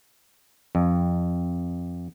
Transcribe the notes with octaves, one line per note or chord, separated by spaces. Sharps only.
F2